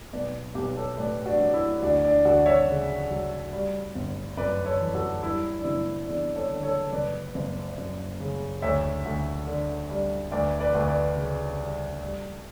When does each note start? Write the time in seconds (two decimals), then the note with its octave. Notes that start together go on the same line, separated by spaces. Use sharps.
0.13 B1 B4 D5
0.55 B1 G4 B4
0.77 A4 C#5
0.98 A2 B4 D5
1.26 D4 F#4
1.40 F#3
1.54 E4
1.82 D2 D4 F#4
2.04 D4
2.25 D2 D4 F#4
2.46 C#5 E5
2.68 C#3
3.10 F#3
3.53 G3
3.95 G1
4.37 F#2 B4 D5
4.66 A4 C#5
4.79 E3
4.94 F#4 A4
5.23 G3 E4
5.57 D4
5.65 F#1 E4
6.07 E2 D4
6.36 A4 C#5
6.50 D3
6.63 A4 C#5
6.92 F#1 B4 D5
7.35 F#1
7.78 F#2
8.20 C#3
8.62 D2 C#5 E5
9.05 D2
9.47 D3
9.90 G3
10.31 D2 B4 D5
10.60 B4 D5
10.75 D2
10.88 B4 D5
11.17 C#3
11.59 G3
12.02 G3